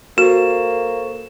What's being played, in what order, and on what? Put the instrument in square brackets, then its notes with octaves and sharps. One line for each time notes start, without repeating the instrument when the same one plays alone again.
[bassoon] A#3 [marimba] F#4 [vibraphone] A4 C5 C#6 [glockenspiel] E7